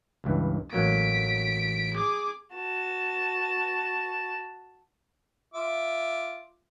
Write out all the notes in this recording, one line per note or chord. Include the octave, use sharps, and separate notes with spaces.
C#2 G2 E3
A1 F#3 A#3 B6 D7
G#4 D6
F#4 A5
F4 E5 D6